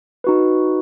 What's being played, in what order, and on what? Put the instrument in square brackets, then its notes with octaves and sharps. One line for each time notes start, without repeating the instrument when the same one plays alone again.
[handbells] D#4 F#4 B4